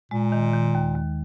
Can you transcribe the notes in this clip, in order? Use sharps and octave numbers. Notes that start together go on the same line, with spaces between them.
A#2 G#3
D#3
D#3
D#2
D#2